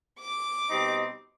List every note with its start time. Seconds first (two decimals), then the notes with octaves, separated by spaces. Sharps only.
0.20 D6
0.70 B2 G3 C4 D#4